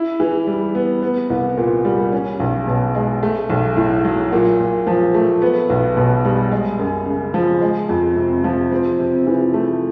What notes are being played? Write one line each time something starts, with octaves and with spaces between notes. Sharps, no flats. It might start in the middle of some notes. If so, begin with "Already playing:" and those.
Already playing: E4
E3
G3
B3
B3
C2
A#2
G3
C#4
B1
B2
G#3
A3
B1
A2
F#3
A#2
A#2
F3
A3
B3
B1
B2
G3
G#3
F#2
C#3
F3
G#3
F2
C3
F3
C4
C3
E3
A3